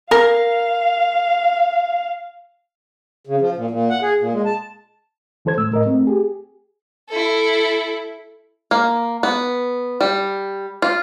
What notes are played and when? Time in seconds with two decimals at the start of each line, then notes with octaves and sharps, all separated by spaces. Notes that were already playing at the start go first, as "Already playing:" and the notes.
0.11 A#4 F5
3.27 C#3
3.41 F3
3.56 A#2
3.71 A#2
3.90 F#5
4.02 G#4
4.20 A#2
4.33 G#3
4.45 A5
5.45 D#2 E3 A4 C5 G#6
5.57 A2 A3 E6
5.72 A2 A#4 D#5
5.85 A3 C4
6.07 G4 G#4
7.09 E4 A4
8.71 A#3
9.23 B3
10.01 G3
10.82 F4